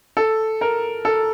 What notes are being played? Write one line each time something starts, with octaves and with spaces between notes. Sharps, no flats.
A4
A#4
A4